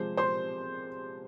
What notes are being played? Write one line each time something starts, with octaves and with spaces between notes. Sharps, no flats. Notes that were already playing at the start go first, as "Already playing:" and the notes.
Already playing: C3 F3 G#3 C5
C5 C6